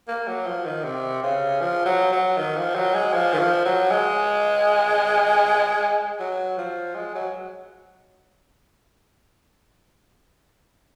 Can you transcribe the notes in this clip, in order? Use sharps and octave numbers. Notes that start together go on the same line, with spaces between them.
A#3
F#3
F3
D#3
C3
C#3
F3
F#3
F#3
D#3
F3
F#3
G#3
F3
D#3
F3
F#3
G#3
F#3
F3
G#3
F#3